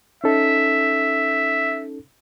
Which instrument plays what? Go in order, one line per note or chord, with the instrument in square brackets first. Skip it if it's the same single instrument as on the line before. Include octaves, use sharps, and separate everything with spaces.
[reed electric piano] C#4 D#4 A4 [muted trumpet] E5